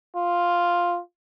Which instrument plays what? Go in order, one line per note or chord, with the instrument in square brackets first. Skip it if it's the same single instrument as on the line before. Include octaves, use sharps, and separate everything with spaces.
[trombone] F4